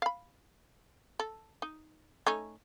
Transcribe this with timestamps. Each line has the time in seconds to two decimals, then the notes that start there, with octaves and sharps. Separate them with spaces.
0.02 F5 B5
1.19 A4
1.62 D#4
2.27 A3 C#4 D#4